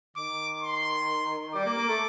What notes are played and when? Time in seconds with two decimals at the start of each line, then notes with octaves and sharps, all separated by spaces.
0.16 D#3 D6
0.63 C6
1.54 G3 D6
1.66 A#3
1.77 A#3
1.88 A3